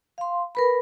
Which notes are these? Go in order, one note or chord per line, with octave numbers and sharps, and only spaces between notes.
F5 C6
A#4 B4 B5